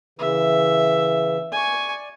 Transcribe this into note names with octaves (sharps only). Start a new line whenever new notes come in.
C#3 E3 E5
D5 G#5 C#6